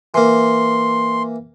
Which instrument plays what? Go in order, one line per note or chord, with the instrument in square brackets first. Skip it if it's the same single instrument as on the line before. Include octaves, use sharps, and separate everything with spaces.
[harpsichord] E3 A#3 [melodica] C6